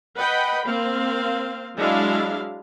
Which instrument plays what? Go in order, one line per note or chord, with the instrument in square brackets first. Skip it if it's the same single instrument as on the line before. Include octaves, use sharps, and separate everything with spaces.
[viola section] B4 D#5 F#5 G5 B5
A#3 C4 F5
F#3 G#3 D4 E4 E5 F5